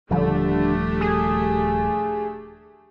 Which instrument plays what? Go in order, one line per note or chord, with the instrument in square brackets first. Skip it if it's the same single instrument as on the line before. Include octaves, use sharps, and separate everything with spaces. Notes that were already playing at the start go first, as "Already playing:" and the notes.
[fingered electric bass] D#1 F3 G3 [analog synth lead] D3 [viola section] A3 D4 G4
[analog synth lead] G#4